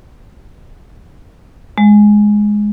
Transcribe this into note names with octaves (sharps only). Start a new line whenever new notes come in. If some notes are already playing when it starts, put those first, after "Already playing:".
G#3